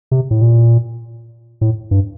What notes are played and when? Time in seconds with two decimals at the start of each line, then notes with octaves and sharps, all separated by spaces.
0.11 C3
0.31 A2
0.42 A#2
1.61 A2
1.91 G2